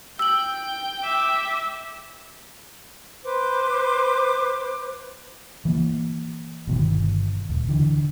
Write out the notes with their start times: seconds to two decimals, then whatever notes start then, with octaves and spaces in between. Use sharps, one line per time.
0.19 G5 E6 G6 F#7
1.03 E5 D6
3.24 B4 C5 D6
5.65 E3 A#3
6.67 G1 B2 D#3
7.49 D#1
7.69 D3 E3